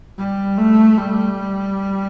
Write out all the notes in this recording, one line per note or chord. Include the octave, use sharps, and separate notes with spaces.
G3
A3
G3